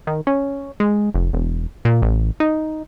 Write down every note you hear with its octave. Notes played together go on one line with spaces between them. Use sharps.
D#3
C#4
G#3
F1
E1
A#2
A1
D#4